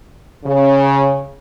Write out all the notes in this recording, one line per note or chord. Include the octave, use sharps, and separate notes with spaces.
C#3